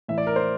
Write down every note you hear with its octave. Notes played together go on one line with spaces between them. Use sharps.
A2 E3 E5
D5
A#4
C5